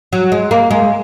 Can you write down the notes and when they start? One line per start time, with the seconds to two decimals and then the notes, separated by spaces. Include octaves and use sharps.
0.13 F#3
0.32 G#3
0.51 A#3
0.71 G#3